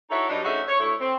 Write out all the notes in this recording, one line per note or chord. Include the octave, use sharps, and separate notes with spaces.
D#4 E4 F#4 A4 C#5
G2 F#3 G3 D4 D#4
D2 C#4 D#4 F#4 G#4 E5
C#5
D2 A3 E4 C#5
C4